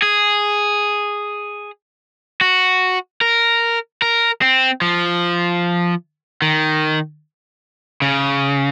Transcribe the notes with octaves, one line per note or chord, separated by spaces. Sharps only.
G#4
F#4
A#4
A#4
C4
F3
D#3
C#3